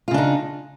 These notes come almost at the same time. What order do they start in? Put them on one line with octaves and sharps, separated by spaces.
F4 C#3 D4 D#4